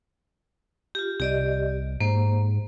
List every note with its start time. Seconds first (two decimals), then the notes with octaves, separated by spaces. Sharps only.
0.95 F4 G4
1.20 C2 G4 D5 D#5
2.01 G#2 A#3 C5